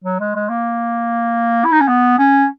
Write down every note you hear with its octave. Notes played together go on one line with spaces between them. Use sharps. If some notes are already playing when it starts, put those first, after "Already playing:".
F#3
G#3
G#3
A#3
E4
D#4
C#4
B3
C#4